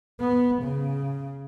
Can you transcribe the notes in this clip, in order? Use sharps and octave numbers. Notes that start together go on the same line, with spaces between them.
B3
C#3